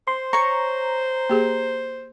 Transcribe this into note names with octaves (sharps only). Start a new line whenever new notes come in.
C5 C6
C#5 A#5 C#6
A#3 G4 G#4